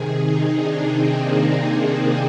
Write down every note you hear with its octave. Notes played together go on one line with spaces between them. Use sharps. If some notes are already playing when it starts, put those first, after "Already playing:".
Already playing: C3 D#3 G#4
D#4
D4
C4
A#3